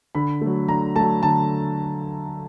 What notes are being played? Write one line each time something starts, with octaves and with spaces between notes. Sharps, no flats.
D3 B5
F#3 A3
D3 A#5
F#3 A3 A5
D3 A5